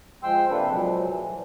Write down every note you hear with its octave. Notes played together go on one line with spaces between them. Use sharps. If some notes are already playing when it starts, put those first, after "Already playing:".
F3 G#3 G5 C6 E6
C3 A#3 D4 A4 B4
A#2 F3 F#3 G#3
E3